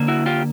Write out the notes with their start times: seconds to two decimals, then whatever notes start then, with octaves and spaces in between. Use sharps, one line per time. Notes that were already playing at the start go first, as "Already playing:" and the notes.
Already playing: D3 A#3
0.08 E4 F#4
0.26 F4 G4